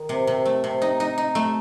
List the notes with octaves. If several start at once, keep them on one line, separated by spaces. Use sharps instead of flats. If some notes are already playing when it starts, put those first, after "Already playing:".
Already playing: D#3
C3
C3
A3
C3
D#4
D#4
D#4
A3